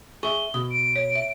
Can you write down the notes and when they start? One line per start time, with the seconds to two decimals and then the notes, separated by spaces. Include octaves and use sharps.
0.23 G#4 E5 C#6 G7
0.54 B2 D#6
0.70 D7
0.96 C#5
1.15 E5